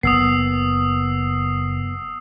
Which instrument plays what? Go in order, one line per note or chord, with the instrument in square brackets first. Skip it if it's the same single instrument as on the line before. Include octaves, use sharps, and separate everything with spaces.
[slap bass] F#1 A#3 [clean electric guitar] B3 [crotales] D#6 E6 C7